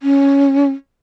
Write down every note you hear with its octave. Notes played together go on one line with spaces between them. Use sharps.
C#4